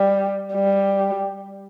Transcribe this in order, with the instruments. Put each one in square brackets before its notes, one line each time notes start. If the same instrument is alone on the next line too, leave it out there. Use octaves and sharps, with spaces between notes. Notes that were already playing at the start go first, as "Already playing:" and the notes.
Already playing: [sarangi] G3
G3